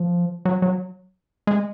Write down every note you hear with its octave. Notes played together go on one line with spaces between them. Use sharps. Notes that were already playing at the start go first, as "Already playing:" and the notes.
Already playing: F3
F#3
F#3
G#3